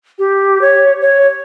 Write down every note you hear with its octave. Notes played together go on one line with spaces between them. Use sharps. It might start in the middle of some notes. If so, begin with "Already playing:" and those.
G4
C#5
C#5